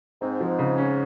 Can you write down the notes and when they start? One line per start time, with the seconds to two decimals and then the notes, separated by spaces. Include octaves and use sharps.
0.22 G#2 C4
0.41 F3
0.59 C#3
0.78 C#4